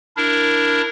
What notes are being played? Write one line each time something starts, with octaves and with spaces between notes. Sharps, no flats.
D4 E4 A#4